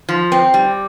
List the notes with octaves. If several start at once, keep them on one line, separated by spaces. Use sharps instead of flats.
F3
C4
G3